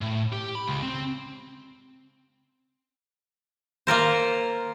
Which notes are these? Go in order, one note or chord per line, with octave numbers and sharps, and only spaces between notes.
A2
G4
B5
C#2
C4
A#3 F4 A#4 C5